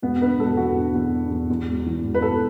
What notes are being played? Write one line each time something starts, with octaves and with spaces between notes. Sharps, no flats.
E1 B3
D3 B4
E1 A4
E2 F#4
D3
E2
D3
E2
E2
E1
E3
E1
B4
E1 A4